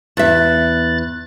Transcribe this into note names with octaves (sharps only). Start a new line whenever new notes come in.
E2 E5 F#6 A6